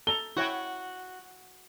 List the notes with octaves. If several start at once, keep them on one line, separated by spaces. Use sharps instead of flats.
A4 A#5 G7
E4 F#4 C#5 G5